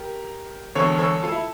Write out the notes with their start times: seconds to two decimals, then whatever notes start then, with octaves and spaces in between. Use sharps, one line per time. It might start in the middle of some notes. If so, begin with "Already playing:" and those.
Already playing: G4 A#4
0.75 E1 E2 D3 A4 C#5
0.99 A4 C#5
1.23 F4 A4
1.32 E4